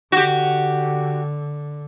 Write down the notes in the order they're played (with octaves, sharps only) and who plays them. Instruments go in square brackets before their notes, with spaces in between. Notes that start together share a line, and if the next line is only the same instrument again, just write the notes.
[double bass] D3 [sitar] F#4 G4